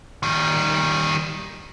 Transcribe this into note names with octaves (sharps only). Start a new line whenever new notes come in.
D#3 G3